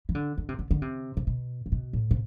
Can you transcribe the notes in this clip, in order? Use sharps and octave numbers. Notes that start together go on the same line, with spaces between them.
E3
D3
D3
C3
D3
D3
C3
C3
B2
A2
B2
A2
C3